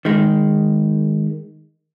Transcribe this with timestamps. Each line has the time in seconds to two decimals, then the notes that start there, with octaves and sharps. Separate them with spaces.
0.05 D#3 G#3